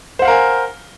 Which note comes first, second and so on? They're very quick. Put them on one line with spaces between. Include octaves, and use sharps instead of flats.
C5 F#5 F5 A#4 G#5